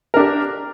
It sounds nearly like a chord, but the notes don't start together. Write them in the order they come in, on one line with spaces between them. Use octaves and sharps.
A#4 D4 G4